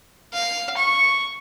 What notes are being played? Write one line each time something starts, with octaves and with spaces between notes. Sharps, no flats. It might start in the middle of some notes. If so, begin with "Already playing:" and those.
F5
C#6